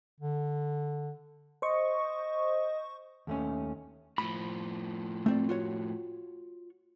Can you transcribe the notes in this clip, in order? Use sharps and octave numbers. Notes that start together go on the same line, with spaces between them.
D3
C5 D#5 C#6
D#2 A3 C#4
A2 F3 B5
A3 C4 D5
F4 F#4 C#5